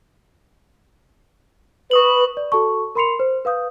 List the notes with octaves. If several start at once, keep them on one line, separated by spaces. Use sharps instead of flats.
B4 C#6 D#6 F#7
D5
F#4 A4 A5 C#6
A#4 B5 C6 C7 C#7 F7
C5
B4 F5 D#6 G6